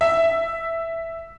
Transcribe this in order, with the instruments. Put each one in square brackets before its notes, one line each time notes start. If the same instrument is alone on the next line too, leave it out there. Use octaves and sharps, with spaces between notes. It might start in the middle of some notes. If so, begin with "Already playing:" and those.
[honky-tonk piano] E5